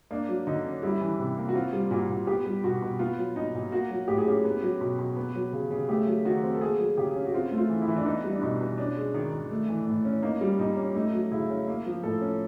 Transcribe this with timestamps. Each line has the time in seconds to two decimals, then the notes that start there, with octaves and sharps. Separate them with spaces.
0.11 A#3 D4
0.29 F#3
0.47 D3 D#4
0.65 C#4
0.83 G3 E4
1.01 E3
1.20 C3
1.37 A#3
1.49 F#4
1.55 C4 F4
1.73 G3
1.91 A#2 F#4
2.09 A#2
2.27 B3 G4
2.46 G3
2.64 B2 F#4
2.82 B2
2.99 B3 F4
3.18 F#3
3.36 A#2 D#4
3.55 A#2
3.72 A#3 F#4
3.90 F#3
4.08 A2 G4
4.18 G#4
4.27 C#4 G4
4.44 B3
4.62 F#3
4.81 B2
4.99 B2
5.17 B3
5.35 F#3
5.53 C#3
5.70 C#3
5.89 A3 G4
6.07 F#3
6.25 D#3 F#4
6.43 C4
6.55 A4
6.61 A#3 G#4
6.80 F#3
6.97 C#3 G4
7.16 C#4
7.25 F#4
7.34 C4 F4
7.51 A3
7.58 F4
7.70 E3
7.82 E4
7.88 E3
7.97 D4
8.06 B3 D#4
8.24 G3
8.31 D4
8.42 B2 D#4
8.61 B2
8.78 C#4 D4
8.97 G#3
9.14 D#3
9.32 D#3
9.51 A3
9.69 E3
9.87 A2
10.05 C#4
10.23 A#3 D#4
10.41 G3
10.59 A#2 D#4
10.77 C#4
10.95 A3 D#4
11.13 F#3
11.32 C#3 E4
11.50 C#4
11.68 A#3
11.86 F3
12.03 A2 A4
12.21 C#4